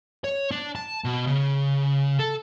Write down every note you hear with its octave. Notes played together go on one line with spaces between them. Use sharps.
C#5
D4
A5
B2
C#3
A4